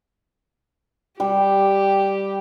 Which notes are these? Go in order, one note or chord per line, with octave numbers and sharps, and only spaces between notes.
G3 G4